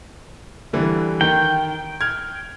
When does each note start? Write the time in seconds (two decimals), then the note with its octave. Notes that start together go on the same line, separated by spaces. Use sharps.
0.73 D3 E3 G3
1.21 D#3 G5
2.01 F6 G#6